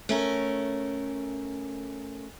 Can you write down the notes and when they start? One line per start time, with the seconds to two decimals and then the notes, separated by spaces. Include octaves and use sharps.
0.09 A3 C#4 A#4